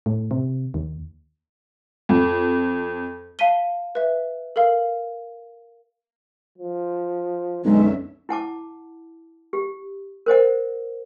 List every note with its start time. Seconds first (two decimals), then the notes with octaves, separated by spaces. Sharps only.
0.06 A2
0.31 C3
0.74 D#2
2.09 F2
3.39 F5 A5 B6 D#7 G7
3.95 B4 E5
4.56 A4 A#4 F5
6.58 F3
7.64 B1 F#2 D3 G#3 C#4 E5
8.29 E4 F#5 A5 D6
9.53 G4
10.26 A#4 C5 D#5 F#5